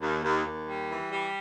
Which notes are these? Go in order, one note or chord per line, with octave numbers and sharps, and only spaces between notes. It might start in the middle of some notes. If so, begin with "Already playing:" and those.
D#2
D#2
D#2
G3
E3
G3